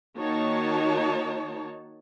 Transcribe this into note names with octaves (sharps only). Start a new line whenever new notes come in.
D#3 A#3 D#4 F#4 C#5 A5